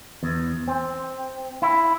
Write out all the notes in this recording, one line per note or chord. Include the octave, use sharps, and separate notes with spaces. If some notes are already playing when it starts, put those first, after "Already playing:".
E2
C4
E4